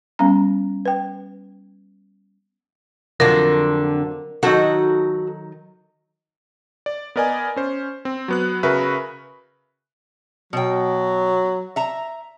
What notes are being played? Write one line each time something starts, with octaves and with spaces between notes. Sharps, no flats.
G3 B3 C#4 A#5
B4 G5
F2 D3 F#3 F4 A#4 D5
D#3 F#3 D#4 F#4 A4
D5
B3 A#4 D5 D#5 G#5
C#4 C5
C4
F#3 B3 F#6
C#3 F#4 A#4 B4 E5 B5
B2 F#3 G5
E5 A#5